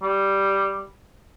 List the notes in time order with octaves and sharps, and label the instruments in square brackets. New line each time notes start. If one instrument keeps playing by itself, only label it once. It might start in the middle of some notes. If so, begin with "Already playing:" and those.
[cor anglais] G3